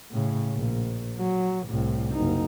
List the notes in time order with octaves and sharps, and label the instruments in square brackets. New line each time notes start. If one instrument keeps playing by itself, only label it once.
[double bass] A2 C#3
A#1
F#3
C2 A2
F#1 D#4